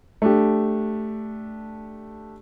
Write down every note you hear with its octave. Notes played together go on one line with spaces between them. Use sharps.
A3 D4 G4